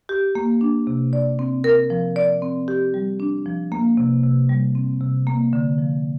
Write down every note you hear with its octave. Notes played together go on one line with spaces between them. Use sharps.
G4
A#3
D4
C3
D5
C4
A#4
F3
D5
C4
G4
G3
D4
F3
A#3
C3
C3
G3
C4
C3
A#3
D3
F3